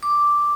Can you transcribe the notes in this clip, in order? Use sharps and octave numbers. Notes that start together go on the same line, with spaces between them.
D6